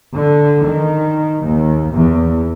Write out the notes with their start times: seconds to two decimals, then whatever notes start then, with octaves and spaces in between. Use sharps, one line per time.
0.14 D3
0.64 D#3
1.44 D#2
1.94 E2